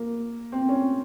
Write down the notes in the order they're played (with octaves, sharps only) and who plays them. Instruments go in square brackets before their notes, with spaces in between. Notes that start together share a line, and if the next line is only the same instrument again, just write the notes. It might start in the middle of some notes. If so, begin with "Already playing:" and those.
Already playing: [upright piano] A#3
C4
C#4